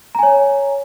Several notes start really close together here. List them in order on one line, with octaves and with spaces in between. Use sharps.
A#5 G#5 C#5